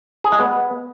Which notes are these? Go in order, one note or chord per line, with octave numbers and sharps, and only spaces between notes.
G#4
G#3
B3